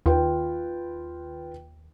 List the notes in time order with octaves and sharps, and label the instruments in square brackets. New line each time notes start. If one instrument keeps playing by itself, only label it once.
[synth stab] D#2 [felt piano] F4 B4 G5